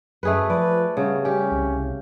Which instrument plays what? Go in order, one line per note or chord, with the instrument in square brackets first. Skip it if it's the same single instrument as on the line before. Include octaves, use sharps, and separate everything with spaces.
[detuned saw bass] F#2 [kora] A3 G#4 B4
[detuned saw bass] F3 [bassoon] B4 [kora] D5
[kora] C#3 [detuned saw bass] G3 [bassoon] B3
[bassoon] C#4 [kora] G4
[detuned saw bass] C2